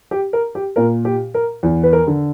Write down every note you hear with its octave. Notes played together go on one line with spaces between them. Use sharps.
G4
A#4
G4
A#2 A#4
G4
A#4
E2
B4
A#4
D3